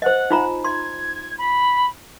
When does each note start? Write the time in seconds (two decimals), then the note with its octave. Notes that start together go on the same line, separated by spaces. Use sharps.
0.02 C5 D#5 F#5
0.31 D#4 F4 A#5
0.64 C6 G#6
1.38 B5